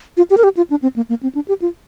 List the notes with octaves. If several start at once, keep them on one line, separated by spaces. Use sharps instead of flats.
F4
G4
A#4
G4
F4
D4
C4
A#3
A#3
C4
D4
G4
F4